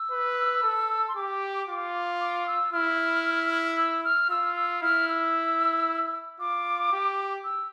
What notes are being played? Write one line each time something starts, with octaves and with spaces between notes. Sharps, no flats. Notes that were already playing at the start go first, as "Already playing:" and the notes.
Already playing: E6
B4
A4
C6
G4 D6
F4
D6
E6
E4 F6
E6
F6
F4 E6
E6
E4 F6
E6
F4 D6
G4
E6